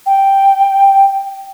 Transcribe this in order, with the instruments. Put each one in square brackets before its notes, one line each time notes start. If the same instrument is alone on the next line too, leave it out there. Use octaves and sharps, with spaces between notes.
[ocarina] G5